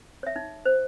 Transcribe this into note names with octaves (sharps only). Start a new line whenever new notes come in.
C#5 E5
D#4
C5